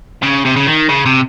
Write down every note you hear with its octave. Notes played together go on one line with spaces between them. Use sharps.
C#3
C3
C#3
D#3
C#3
C3